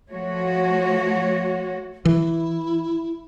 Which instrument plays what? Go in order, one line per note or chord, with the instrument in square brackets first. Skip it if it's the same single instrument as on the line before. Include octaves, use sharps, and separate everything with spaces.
[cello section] F3 A3 F#4 C#5
[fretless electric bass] E3 [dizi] E4